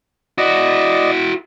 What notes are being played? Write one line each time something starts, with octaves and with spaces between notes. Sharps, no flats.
E4 F#4 D5 D#5